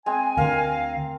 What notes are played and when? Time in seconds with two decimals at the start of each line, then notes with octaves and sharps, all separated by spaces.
0.06 G#3 C4 G#5
0.37 D2 D3 A#4 F5